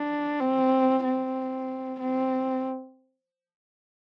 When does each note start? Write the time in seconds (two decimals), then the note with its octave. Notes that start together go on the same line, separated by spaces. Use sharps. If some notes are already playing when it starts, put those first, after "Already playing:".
Already playing: D4
0.40 C4
1.04 C4
2.00 C4